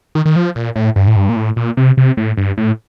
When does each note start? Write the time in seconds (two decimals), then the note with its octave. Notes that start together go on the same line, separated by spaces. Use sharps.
0.15 D#3
0.25 D#3
0.36 F3
0.55 A#2
0.76 A2
0.96 G2
1.07 A2
1.16 G2
1.29 A#2
1.36 A2
1.56 A#2
1.77 C3
1.97 C3
2.17 A2
2.37 G2
2.57 A2